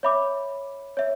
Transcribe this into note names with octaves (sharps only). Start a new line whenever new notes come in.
C#5 E5 B5 D6
C#5 E5